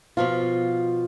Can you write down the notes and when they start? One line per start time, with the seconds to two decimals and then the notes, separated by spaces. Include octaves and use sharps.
0.17 B2 F3 F4